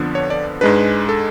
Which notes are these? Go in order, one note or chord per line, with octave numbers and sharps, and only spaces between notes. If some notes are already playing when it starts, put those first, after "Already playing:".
Already playing: F2 D3 F3 B3 D4
C#5
D5
G#2 G#3 D4 B4
A4